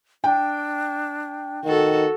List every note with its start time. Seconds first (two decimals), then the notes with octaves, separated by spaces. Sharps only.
0.24 D4 G5
1.65 D#3 F#4 A4